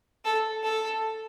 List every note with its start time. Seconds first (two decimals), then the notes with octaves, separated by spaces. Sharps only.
0.25 A4
0.63 A4